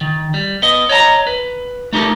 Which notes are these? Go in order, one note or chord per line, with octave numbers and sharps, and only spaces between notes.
D#3
G3
B3 D#5
C#5 D#5 A5 A#5
B4
A3 D#4 G4 A4 A#4